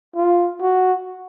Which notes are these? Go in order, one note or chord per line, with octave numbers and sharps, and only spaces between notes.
F4
F#4